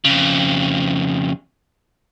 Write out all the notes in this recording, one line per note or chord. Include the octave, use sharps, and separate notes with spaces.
F2 C#3